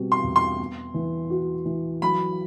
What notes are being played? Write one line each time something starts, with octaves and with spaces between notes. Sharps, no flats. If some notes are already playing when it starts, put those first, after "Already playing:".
Already playing: B2 G3 C4
C6
E2
C6
B3
E3
F#4
E3
F#3 B5